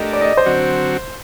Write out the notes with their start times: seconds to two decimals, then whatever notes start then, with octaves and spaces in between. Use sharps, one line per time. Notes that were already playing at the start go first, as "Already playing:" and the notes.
Already playing: A3 D4 G4 A#4 D#5
0.13 D5
0.21 D#5
0.37 C5
0.46 D3 F#3 C4 F#4